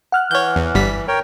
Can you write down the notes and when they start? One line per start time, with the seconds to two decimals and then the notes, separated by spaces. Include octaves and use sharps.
0.12 F#5 F6 F#6
0.31 E3 C#5 G6
0.56 E2
0.75 G1 G3 B6
1.08 A#4 C#5 G5